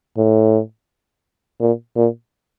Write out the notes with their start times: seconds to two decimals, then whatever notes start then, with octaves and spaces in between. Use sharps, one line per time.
0.17 A2
1.60 A#2
1.96 A#2